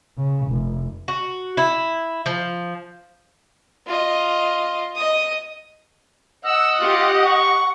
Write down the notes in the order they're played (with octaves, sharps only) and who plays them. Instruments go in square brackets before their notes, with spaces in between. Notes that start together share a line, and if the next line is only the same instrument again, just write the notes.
[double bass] C#3
F1
[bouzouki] F#4
E4
F3
[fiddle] F4 D#5
D#5 D#6
[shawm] D#5 [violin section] F#5 [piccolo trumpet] E6
[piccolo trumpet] F4 [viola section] G4
[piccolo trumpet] C#6